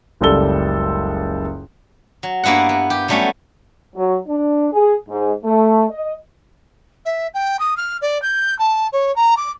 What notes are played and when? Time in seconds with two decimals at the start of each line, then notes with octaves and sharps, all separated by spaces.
0.21 F#1 C#2 G3 A4 G7
2.23 F#3
2.44 G2 A#3 B3 E4 F#5
2.69 B3
2.90 G4
3.08 F#3 G3 A3 B3 C#4 F#4
3.96 F#3
4.28 D4
4.73 G#4
5.08 G#2
5.44 A3
5.90 D#5
7.05 E5
7.34 G5
7.59 D#6
7.77 F6
8.01 D5
8.22 G6
8.58 A5
8.92 C#5
9.16 A#5
9.37 D6